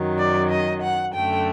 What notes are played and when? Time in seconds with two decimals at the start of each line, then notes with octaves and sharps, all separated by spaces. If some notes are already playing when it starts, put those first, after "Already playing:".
Already playing: F#2 D#3 F#3
0.18 D5
0.50 D#5
0.82 F#5
1.13 F#2 D3 A3 G5